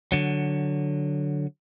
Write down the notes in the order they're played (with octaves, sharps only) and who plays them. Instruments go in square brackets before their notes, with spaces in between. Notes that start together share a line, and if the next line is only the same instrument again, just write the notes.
[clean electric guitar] D3 F#3